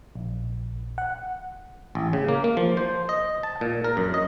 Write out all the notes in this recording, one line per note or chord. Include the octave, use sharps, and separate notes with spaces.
A#1
F#5
A1
C#3
A#3
A#3
F3
C5
D#5
A5
A#2
A#4
F#2
D#5